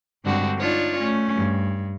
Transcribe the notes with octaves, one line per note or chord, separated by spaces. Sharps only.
G2 D3 G#3 C4 D4 F#4
D4 D#4 F4 C#5 D5
A3 C#4
G2